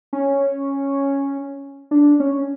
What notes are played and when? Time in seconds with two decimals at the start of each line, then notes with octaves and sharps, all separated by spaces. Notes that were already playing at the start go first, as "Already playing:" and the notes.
0.13 C#4
1.91 D4
2.20 C#4